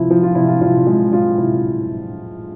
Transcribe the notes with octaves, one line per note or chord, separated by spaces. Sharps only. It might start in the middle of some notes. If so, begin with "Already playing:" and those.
Already playing: C3 F3 E4
F3
F4
C3 E4
F4
C3 F4
G#3 F4
G#3 F4
C3 E4